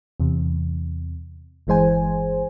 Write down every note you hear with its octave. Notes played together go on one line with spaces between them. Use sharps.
E2 C3
G1 E3 G#3 C5 G#5